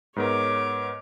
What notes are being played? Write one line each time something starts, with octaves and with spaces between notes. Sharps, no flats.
G#2 B3 A#4 C#5 D6